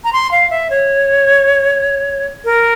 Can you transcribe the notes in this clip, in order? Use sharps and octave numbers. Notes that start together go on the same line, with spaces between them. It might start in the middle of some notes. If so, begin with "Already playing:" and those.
A#5
C6
F5
E5
C#5
A#4